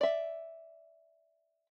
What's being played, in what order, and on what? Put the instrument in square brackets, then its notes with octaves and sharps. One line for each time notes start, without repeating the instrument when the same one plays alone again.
[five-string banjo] D5 E5